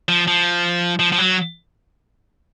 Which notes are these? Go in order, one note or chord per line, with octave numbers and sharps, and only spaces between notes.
F3
F3
F3
F3
F#3